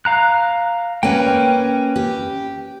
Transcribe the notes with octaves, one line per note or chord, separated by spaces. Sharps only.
F5 A#5 F#6
A#3 C#4 B4 G5
G4